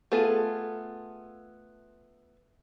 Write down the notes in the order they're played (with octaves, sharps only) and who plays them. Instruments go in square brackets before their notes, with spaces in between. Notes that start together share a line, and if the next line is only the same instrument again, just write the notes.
[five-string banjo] A3 B3 F4 G#4 A4